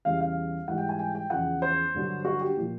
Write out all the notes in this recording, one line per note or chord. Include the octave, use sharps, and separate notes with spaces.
E2 C#3 E3 G3 F5
F5
G#2 E3 G3 F#5
G5
G#5
G5
G5
E2 C#3 F3 F#5
C5
G2 D3 F#3
F#4
G4
A#2 F3